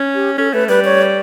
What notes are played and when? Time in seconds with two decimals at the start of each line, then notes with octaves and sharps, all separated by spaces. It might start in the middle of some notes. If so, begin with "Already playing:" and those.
Already playing: C#4
0.15 G4
0.38 C#4 A4
0.53 A3 B4
0.69 G3 B4
0.85 C#5